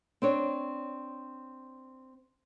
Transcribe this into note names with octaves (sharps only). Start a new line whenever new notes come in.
C4 D4 C#5